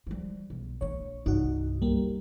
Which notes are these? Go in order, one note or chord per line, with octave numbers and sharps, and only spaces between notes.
F3 G3
B1
A#1 D4 C#5
C2 G2 D#4 F#4
G1 G3 A#3